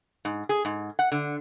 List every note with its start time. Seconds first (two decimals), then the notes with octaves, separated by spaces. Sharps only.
0.25 G#2
0.49 G#4
0.65 G#2
0.99 F#5
1.12 D3